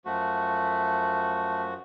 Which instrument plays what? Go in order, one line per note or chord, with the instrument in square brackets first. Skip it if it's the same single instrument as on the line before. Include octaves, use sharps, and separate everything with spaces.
[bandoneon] F#2 F3 F#4 [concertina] A3